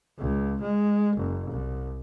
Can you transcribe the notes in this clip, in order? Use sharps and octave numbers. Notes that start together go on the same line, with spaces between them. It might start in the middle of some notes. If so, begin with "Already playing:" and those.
C#2
G#3
F#1
C2